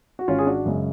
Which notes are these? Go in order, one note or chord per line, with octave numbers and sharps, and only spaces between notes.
F#4
G#1 C#4 F4
G#4
D4 F#4
F#2 C#3 G#3